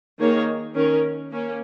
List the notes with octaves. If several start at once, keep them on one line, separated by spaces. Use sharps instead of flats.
D#3 A#3 D#4 G#4 C#5
D#3 C#4 A#4
A#3 C#4